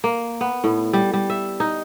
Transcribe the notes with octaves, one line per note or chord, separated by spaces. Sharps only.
A#3
B3
A2
G3
G3
E5
D#4